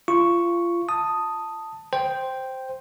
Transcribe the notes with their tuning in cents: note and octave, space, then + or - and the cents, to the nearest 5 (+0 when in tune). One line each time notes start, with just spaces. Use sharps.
F4 -25 C#6 +0
A5 +10 D#6 +0
C5 +0 G5 +0